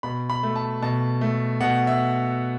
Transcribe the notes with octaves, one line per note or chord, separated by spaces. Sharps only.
B2 B5
B5
A3
A5
B2 A5
A3
B2 F#5
E5